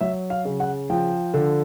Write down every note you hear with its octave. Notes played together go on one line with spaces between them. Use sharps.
F#3 E5
F5
C#3
F#5
F3 G5
D3